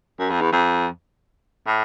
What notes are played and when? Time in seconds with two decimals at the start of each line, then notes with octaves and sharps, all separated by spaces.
0.19 F#2
0.30 F2
0.41 E2
0.52 F2
1.67 A2